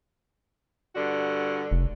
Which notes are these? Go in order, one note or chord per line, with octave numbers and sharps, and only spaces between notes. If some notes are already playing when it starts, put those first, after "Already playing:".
G2 D3 F#4
F1